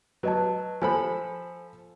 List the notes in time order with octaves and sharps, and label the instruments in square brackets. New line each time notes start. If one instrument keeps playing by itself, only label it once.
[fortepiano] F#3 [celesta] B4 D#5 A5
[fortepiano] F3 A4 B5 [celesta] C5 G#5